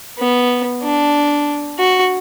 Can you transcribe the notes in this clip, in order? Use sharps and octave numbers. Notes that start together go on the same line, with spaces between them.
B3
D4
F#4